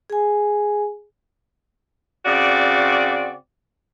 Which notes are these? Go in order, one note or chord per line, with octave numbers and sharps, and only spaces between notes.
G#4 G#5
C#3 C4 F#4 D5